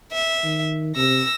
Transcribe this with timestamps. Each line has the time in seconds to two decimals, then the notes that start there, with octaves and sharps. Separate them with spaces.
0.12 E5
0.44 D#3
0.96 C3 E6 A#6